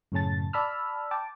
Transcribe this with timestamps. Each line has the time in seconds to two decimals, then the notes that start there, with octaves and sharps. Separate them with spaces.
0.12 F#2 A2 C#3 C#4 A5 A6
0.53 D5 A5 B5 E6 F6
1.11 G5 A5 D6